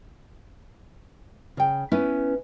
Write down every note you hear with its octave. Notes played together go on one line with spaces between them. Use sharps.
C#3 G5
B3 C#4 E4 B4